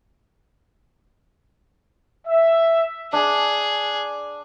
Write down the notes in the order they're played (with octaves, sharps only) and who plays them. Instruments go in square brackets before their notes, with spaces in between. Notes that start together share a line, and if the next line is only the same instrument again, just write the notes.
[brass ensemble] E5
[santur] D4 [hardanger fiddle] G#4